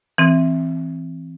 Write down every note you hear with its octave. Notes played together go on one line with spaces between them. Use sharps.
E3 C4